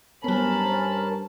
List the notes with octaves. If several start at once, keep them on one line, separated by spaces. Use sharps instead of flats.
G2 F#3 B3 C#4 A#4 C5 A5 B5